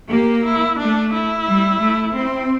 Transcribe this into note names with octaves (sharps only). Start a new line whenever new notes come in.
A#3 G4
E4
A3 D4
E4
G3
A3
C4